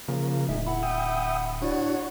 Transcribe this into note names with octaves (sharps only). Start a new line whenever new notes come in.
C#3 F3 A#3
D1 G#3 D#4 E5
E4 F#5 B5
E5 G5 D#6
D4 E4 F#4 C#5 D5